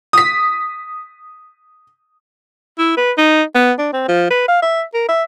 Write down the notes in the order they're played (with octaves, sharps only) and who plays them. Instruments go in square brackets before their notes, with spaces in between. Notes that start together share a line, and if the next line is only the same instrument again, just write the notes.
[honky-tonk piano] D#6 B6
[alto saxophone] E4
B4
D#4
B3
D4
C4
F3
B4
F5
E5
A#4
E5